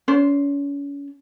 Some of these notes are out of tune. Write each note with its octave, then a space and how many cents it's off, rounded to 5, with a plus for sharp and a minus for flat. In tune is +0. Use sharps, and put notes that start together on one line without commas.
C#4 +35 C5 +0